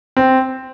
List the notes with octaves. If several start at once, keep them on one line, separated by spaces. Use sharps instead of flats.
C4